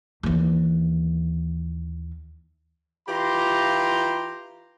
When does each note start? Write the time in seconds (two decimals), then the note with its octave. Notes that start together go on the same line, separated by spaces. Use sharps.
0.23 D#2 E3
3.08 E3 F4 G4 A#5 C6